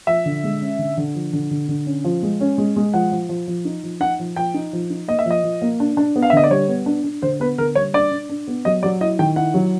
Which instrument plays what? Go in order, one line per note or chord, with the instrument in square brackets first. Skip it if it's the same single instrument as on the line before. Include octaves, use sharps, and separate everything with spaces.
[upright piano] F3 [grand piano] E5
[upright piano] D3
G#3
C#4
D3
D3
F3
D3
D3
D3
C#4
F3
G#3
C#4
G#3
G#3
[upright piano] F3 [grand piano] F#5
[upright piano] F3
F3
F3
D#4
F3
[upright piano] D#4 [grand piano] F#5
[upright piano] F3
[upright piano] F3 [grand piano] G5
[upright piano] D#4
F3
D#4
[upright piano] A#3 [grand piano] D#5
[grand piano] E5
[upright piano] F3 [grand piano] D#5
[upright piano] F3
A#3
D4
D4
B3
[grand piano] F5
E5
[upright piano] D3 [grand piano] D#5
[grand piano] D5
[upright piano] G3 [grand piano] C#5
[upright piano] B3
D4
D4
[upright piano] D3 [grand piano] C5
[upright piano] B3 [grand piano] B4
[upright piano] D3 [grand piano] A#4
[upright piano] G3 [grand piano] C#5
[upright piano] D4 [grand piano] D5
[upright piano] D4
D4
B3
[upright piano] F#3 [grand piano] D#5
[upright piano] F#3 [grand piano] D5
[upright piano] E4 [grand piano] D#5
[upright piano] D#3 [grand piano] G5
[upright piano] E4 [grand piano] F#5
[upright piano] F#3